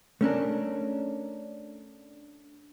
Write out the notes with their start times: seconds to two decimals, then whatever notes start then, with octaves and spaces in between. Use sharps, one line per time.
0.21 A3 C#4 D4 A#4